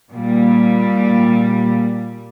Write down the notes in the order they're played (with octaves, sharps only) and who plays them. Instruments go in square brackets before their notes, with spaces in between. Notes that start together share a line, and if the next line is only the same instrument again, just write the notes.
[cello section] A#2 G3